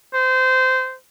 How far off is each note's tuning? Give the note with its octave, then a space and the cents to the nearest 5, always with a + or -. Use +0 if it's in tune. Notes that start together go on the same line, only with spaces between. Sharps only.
C5 -20